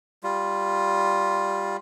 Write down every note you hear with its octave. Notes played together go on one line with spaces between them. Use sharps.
G3 F4